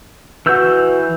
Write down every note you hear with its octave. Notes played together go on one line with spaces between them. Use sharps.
E3 F#4 B4 E6 G6